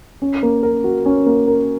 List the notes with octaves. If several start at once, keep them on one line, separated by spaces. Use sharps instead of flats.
C#4
A#3
A#4
F#4
C#4
A#3
A#4